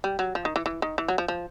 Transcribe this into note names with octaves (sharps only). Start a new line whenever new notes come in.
G3
F#3
F3
D#3
E3
E3
D#3
E3
F#3
F3
F3